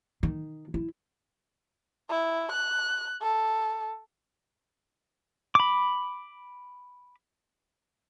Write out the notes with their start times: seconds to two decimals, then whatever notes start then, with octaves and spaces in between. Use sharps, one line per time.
0.23 D#3
0.74 E4
2.10 E4
2.52 F#6
3.21 A4
5.55 B5 D6